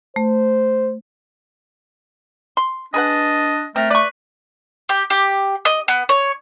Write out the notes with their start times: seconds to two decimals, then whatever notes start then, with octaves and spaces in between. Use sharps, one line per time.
0.16 A3 C5
2.57 C6
2.94 D4 G#4 B4 D#5 F#5
3.76 A3 C4 A#4
3.90 B4 D5 C#6
4.89 G4
5.10 G4
5.65 D#5
5.88 B3
6.09 C#5